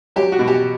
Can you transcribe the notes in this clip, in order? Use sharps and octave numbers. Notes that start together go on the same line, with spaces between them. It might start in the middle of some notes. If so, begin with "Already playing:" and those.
F#3 G4
F#4
B2
G4